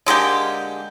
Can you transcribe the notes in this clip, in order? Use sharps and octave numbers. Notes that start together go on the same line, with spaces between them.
D3 G#3 A#3 G4